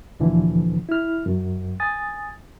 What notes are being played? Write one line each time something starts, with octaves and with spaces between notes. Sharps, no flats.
D2 A#2 D3 E3 F3
E4 F6
F#2
G#5 D#6 A6